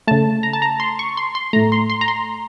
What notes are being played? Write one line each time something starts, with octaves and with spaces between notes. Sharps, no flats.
C#3 A3 A5
A#5
A5
A#5
C6
C#6
C6
C6
A2 A3 A#5
C6
C6
A#5
C6